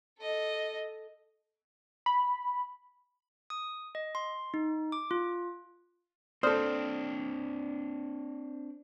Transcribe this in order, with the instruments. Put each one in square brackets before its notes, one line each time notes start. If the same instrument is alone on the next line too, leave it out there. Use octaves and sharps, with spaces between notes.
[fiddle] A4 D#5
[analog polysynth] B5
[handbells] D#6
D#5
C6
D#4
D6
F4
[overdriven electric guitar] C4 D4 [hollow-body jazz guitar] A4 C5 [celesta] D5 D#6 F6